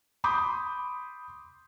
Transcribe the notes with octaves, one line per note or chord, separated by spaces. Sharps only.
B5 C6 D6 D#6 G6